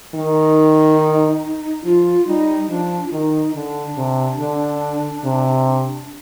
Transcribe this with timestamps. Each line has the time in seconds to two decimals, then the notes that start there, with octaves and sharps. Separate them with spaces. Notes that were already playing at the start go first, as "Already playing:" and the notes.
0.15 D#3 D#4
1.84 F3 F4
2.27 G3 D#4
2.69 F3 D4
3.07 F4
3.12 D#3 D#4
3.55 D3 D4
3.97 C3
4.39 D3
5.24 C3